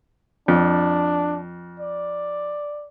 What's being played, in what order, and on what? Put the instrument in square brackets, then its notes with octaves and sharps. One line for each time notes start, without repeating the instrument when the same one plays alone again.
[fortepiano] F2 [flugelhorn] D4
[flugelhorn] D5